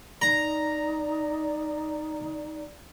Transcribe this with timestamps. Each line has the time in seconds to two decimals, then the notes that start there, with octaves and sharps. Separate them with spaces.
0.22 D#4 D5 A#5